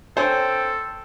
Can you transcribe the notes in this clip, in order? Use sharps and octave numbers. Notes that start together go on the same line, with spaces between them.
C4 A4 C5 C#5 G5 G#5